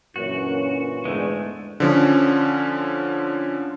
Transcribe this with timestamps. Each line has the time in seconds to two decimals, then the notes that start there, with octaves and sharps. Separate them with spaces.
0.16 F#2 A#2 D3 E3 A#3 C#4 F#4
1.05 E2 G#2 D3 G#3 A3
1.80 D3 F3 C#4